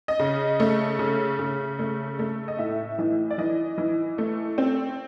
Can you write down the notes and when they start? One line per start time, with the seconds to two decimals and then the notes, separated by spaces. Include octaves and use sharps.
0.08 D#5
0.19 C#3
0.60 A3
0.99 C#3
1.39 C#3
1.79 A3
2.19 A3
2.48 D#5
2.58 A2 E5
2.98 E3 D#5
3.30 D5
3.38 E3 D#5
3.78 E3
4.18 A3
4.58 C4